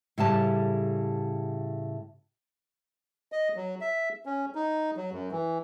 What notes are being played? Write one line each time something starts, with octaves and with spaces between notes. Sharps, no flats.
A2 C#3 G3 A5
D#5
F#3
E5
C#4
D#4
F#3
F#2
E3